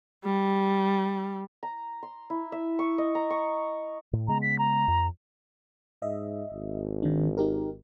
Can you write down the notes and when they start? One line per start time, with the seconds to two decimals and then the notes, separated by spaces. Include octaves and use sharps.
0.25 G3
1.63 A#5
2.03 C6
2.30 E4
2.52 E5
2.79 C#6
2.98 D#5
3.15 A#5
3.30 C#6
4.13 A2
4.28 C#3 G#3 B3 A#5
4.42 B6
4.59 A#5
4.88 F2
6.02 G#2 D#5 E5
6.52 G#1
7.03 D#3 D4
7.38 D#4 G4 A#4